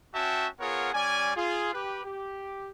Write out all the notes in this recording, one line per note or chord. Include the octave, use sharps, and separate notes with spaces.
C#4 F#4 C#5 E5 G5 A5
B3 F4 G#4 A#4 C#5 F#5
G3 C#4 D5 G#5
F4 G#4
G4 B4
G4